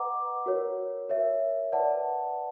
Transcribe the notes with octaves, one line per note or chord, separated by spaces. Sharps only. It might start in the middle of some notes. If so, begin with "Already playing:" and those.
Already playing: B4 D#5 F#5 A#5 D6
F#4 A#4 C#5
A#4 C#5 E5
B4 D5 F#5 A5